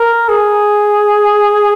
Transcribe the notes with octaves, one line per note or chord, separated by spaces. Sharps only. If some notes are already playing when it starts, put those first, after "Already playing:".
Already playing: A#4
G#4